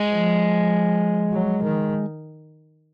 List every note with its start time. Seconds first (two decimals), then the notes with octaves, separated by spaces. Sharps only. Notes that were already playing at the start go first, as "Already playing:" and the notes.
Already playing: G#3
0.09 F3
1.32 F#3
1.63 D#3